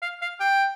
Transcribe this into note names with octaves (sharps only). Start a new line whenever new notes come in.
F5
F5
G5